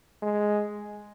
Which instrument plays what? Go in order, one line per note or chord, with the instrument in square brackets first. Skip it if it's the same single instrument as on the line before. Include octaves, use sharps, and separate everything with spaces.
[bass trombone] G#3